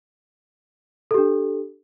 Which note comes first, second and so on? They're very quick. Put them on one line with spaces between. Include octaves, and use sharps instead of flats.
A4 G4 D4